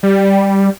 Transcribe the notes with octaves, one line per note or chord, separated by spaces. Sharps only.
G3